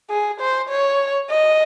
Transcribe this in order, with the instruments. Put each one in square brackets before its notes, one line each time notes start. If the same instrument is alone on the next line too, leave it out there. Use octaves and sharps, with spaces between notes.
[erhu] G#4
C5
C#5
D#5